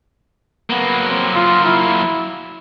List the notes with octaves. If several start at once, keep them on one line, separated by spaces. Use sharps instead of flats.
F#3 A#3 B3
C4
F4
E4